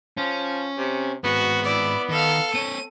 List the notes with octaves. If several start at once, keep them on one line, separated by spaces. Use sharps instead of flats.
F3 C#4
C3
G#2 B3 C4 F#4
E4 D5
D#3 A4 F5
C4 C#5 D#7